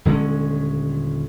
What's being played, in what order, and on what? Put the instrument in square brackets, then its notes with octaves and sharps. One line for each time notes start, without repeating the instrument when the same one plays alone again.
[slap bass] D#1 D3 G#3 C#4